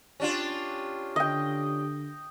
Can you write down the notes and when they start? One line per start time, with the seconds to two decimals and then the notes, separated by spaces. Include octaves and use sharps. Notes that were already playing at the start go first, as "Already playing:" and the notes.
0.20 C#4 D4 F4 G4
1.16 D3 D#5 G5